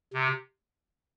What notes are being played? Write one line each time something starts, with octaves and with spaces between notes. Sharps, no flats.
C3